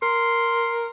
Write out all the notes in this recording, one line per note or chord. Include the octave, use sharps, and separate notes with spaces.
A#4 C6